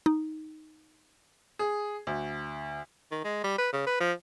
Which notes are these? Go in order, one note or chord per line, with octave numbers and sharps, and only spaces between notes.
D#4
G#4
D2
D#3
G#3
G3
B4
C#3
B4
F3